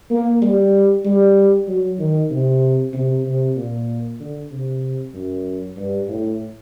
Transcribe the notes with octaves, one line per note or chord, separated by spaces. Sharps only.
A#3
G3
G3
F#3
D#3
C3
C3
C3
A#2
D3
C3
F#2
G2
A2